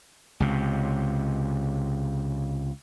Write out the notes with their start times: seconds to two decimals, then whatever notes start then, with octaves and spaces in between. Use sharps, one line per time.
0.40 C#2 C3